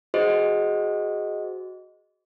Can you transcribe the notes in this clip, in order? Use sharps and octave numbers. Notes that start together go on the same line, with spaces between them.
F#4 G#4 C5 D#5